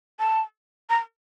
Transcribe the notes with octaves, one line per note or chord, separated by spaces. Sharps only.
A5
A#5